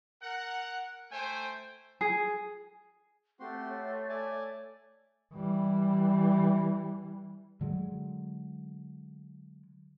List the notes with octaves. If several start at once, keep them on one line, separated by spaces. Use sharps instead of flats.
A#4 F#5
A3 C5 G5 G#5
G#4
A3 C4 F#4 G4 C6
C#5
D5 G#5 A5
E3 G3
D3 F#3 G#3